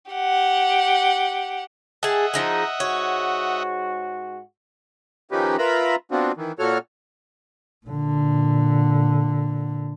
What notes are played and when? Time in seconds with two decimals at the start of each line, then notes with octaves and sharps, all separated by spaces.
0.11 G4 F#5
2.03 G#4 D#5 E5 F#5 A5
2.34 F3 D#4 G#4
2.80 G#2 G#3 F#4 C#5
5.31 D#3 F3 C#4 D#4 G4 B4
5.58 F4 A#4 B4 E5 A#5 B5
6.11 B3 C4 D4 F4 F#4
6.37 D#3 E3
6.59 A#2 F#4 A4 C#5 F6
7.87 A#2 D3